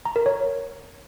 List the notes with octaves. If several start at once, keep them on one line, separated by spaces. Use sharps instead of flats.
A#5
A#4
C#5